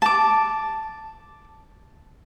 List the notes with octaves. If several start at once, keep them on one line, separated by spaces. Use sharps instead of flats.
A5 D6